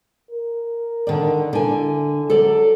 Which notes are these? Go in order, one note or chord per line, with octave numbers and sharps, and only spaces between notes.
A#4
D3 D#3 D5
D3 E4 G#5
F#3 A4 D5